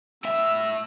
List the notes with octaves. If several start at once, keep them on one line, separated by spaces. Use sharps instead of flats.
A2 E5 E6